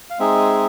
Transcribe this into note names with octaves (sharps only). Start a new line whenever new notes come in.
F5
G#3 C4 D#4 G#4 E5